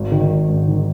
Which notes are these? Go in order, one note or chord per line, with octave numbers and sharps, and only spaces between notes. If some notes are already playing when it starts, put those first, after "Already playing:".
Already playing: G#1
D#3
G#1
G#2
D#3